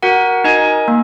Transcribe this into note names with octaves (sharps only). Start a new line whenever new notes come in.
F#4 A#4 F#5
D#4 A#4 D#5 G#5
A#3